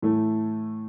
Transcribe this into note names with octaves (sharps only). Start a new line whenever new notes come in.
A2 E3 A3